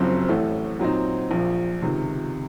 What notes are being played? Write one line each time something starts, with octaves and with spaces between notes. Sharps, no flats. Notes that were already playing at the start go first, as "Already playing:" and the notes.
Already playing: F#1 F#2 F3 C4
A1 A2 A3
A#2 F#3 C4 D#4
A#1 A#2 F3
C#2 C3 D#3